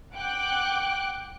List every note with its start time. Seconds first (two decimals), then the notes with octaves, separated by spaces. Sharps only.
0.13 F#5 G5 D6 F#6